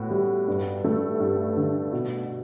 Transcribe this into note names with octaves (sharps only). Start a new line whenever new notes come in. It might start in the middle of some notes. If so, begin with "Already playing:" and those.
Already playing: A2 B3 F#4
G3
G2
A3
G2
D3
B2